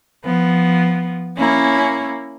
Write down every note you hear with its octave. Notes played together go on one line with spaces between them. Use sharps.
F3 B3
A#3 C#4 E4